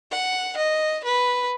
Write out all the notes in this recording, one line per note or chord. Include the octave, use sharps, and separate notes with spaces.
F#5
D#5
B4